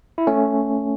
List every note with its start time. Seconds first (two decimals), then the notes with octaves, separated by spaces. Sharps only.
0.18 E4
0.27 A3 C#4